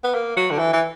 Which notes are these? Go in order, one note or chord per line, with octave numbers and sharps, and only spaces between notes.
B3
A#3
F#3
D3
E3
E3